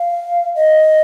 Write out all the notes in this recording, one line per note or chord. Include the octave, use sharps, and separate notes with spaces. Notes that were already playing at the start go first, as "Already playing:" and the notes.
Already playing: F5
D#5